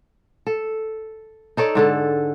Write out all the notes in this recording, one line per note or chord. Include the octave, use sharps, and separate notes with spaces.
A4
D#4 A4 C#5 D5
G#2 D3 A4